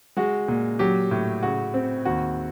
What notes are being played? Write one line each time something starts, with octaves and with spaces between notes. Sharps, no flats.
G#3 F#4
A#2
F#3 G4
A2
C#3 F#4
C4
D#2 F#4